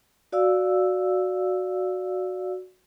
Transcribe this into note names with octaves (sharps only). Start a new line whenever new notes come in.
F#4 D5 F5 E6